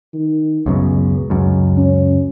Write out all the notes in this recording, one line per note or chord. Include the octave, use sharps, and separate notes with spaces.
D#3
C#2 F#2 B2 G#3
C#2 F#2
C#4